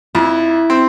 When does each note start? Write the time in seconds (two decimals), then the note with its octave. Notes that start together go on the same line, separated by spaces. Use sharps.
0.15 F2 E4
0.70 C4